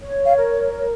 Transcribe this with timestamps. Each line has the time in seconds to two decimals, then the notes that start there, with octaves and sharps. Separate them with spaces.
0.01 C#5
0.25 F5
0.37 A#4